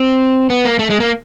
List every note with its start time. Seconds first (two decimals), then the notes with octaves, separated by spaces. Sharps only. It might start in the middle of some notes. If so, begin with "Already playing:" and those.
Already playing: C4
0.50 B3
0.65 A#3
0.79 A3
0.90 G#3
1.00 A#3